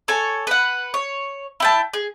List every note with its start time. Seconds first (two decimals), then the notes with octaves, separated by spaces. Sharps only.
0.08 A4 C#5 G#5
0.47 B4 F#5
0.94 C#5
1.60 E4 G5 A5
1.93 G#4